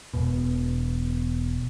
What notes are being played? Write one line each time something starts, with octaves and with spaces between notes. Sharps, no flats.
E1 B2